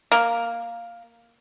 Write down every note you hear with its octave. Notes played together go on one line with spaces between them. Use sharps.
A#3